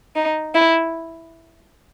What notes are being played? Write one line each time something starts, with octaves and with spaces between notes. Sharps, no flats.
D#4
E4